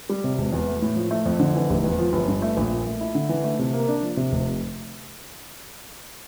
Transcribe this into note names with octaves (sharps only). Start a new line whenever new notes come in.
G3
C3
E1
E2
A3
A2
F3
A3
F2
D3
E3
F1
E2
F3
G1
G2
A3
A#1
A#2
A3
E4
D3
E3
A3
C3
A#3
D4
F3
C3
F1